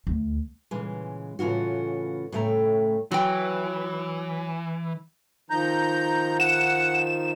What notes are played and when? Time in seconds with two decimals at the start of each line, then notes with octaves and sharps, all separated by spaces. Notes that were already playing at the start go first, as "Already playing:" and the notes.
0.07 D2
0.71 A#2 C#3 E3 G#3
1.39 A2 C#3 E3 F4 F#4
2.32 A2 C#3 A3 G5 A#5
3.12 E3 F#3 G5
5.50 D#3 F3 D#4 A#5 G6
6.40 F#5 E7